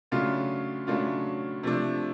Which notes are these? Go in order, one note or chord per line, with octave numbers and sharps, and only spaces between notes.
C#3 F#3 A3 D4 F4
C#3 F#3 A3 D4 F4
C3 F3 A3 D4